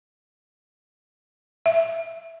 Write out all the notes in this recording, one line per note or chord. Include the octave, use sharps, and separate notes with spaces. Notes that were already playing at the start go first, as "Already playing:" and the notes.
E5